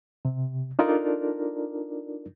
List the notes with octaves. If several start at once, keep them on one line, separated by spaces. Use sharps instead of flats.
C3
D4 D#4 F4 A4 A#4 D5